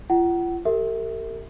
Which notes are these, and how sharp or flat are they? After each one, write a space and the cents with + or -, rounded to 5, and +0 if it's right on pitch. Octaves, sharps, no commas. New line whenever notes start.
F4 -35 F#5 +30
G4 +0 A#4 -45 E5 -15